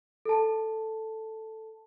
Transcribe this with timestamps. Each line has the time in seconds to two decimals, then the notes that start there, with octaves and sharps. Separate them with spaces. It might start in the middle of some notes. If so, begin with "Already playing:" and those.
0.25 A4 A5